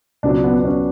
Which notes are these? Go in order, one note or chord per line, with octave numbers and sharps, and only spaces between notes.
C#2 B2 F#3 D4
B3
B3
C#4